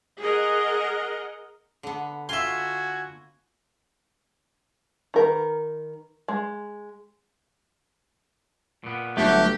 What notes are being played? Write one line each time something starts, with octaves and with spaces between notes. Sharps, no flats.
G#4 A#4 D#5 F#5
D3 B3
F4 F#4 E5 G#5 C6
D#3 A#4 B4
G#3
A#2 B3
G1 G2 F#3 A3 G4 F#5